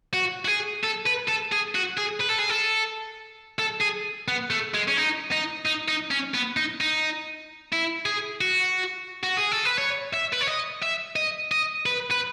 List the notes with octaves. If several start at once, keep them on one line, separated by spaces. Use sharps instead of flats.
F#4
F#4
G#4
A4
B4
A4
G#4
F#4
G#4
B4
A4
G#4
A4
A4
G#4
B3
A3
G#3
C#4
D#4
D#4
D#4
D#4
C#4
B3
D#4
D#4
E4
G#4
F#4
F#4
G#4
A4
B4
C#5
E5
B4
C#5
D#5
E5
D#5
D#5
B4
B4